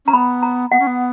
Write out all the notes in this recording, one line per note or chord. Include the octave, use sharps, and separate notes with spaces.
C#4 A#5
B3 B5
A#5
B3 F#5
C#4
B3